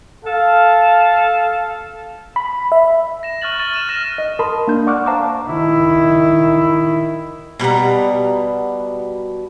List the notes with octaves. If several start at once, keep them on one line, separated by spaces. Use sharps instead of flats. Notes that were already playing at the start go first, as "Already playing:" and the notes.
A4 F5
B5
E5
A#6 E7
C#6 F6 F#6 A6 F#7
F6 A6 D#7
F6 D#7 E7
F6 A#6 D#7 E7
D#5
A#4 A5 B5 C6 D#6
A#3 D4 G6
D5 F#5 C#6 D6 F6 F#6
C5 F5 A5 A#5 C#6 D6
D#3 E4
B2 G3 F#5 A#5